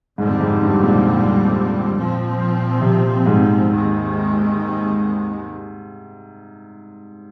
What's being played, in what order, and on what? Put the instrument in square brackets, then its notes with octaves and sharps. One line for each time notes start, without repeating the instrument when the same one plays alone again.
[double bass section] F2 D3 G3 C4 [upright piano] G#2
[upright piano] G#2
G2
A#2
G#2
A#2
[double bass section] A#2 F3 C4
[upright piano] C3
G#2
[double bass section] D#2 D#3 G#3 C4